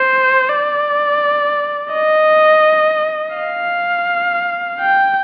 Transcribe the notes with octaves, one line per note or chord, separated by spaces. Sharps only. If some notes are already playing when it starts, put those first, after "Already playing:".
Already playing: C5
D5
D#5
F5
G5